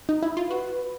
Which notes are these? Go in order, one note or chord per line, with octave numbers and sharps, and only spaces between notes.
D#4
E4
F4
F#4 B4